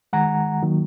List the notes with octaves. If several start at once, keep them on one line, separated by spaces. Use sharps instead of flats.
D#3 G#3 F#5 A#5
D#3 F#3 A#3